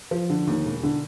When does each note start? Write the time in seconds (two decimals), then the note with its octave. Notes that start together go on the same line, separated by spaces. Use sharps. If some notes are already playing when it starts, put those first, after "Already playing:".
0.11 F3
0.30 D3
0.47 D#2
0.65 E1
0.83 D3